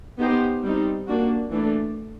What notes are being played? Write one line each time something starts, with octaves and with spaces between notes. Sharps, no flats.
B3 D#4 G4 C5
G3 C4 D#4
A#3 D4 F#4
E3 A3 D4